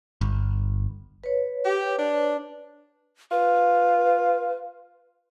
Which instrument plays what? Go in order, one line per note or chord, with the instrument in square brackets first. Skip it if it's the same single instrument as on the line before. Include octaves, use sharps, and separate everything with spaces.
[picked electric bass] G1
[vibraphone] B4 C#5
[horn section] G4
D4
[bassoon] F4 [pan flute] B4